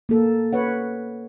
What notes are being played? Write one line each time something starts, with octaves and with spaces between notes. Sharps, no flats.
A#3 A4
B4 C#5 F#5